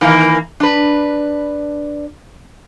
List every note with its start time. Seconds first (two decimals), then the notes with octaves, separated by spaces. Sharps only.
0.01 D#3 E3 A#3
0.60 D4 B4